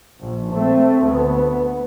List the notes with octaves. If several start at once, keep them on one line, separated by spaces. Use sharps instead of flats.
A#1
A3 C4
D2 B3